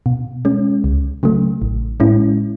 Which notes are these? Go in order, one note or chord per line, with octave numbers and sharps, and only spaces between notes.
B2
G#3 C#4
C#2
C#3 F#3 A3
A1
A2 G#3 C#4 E4